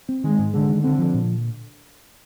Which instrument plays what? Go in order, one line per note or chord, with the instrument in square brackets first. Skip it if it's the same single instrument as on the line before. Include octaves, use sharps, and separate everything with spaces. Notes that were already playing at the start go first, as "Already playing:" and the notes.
[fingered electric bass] C4
[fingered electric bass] D#3 [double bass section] G#3
[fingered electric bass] G#2
[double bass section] D3 [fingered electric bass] G#3
[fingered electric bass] D#3
[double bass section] D3 [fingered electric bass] C4
[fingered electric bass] F3
A#2